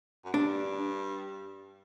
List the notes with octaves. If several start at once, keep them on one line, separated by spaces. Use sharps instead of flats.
F#2
G2 D4